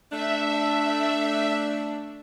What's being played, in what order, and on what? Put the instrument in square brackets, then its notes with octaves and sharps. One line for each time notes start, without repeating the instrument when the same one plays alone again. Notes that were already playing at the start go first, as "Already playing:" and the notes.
[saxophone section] A3 D4 [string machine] E5